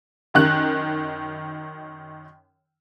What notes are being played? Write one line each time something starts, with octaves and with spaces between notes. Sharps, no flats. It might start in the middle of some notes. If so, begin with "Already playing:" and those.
F#2 D#3 F#6